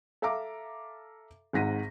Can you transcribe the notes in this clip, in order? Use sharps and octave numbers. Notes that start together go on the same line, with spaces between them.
A4 E5 F5 A#5 D6
G#1 G#2 F#5 A#6 B6 D#7